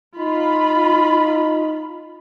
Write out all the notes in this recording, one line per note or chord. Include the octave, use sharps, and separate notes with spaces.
D#4 F4 B5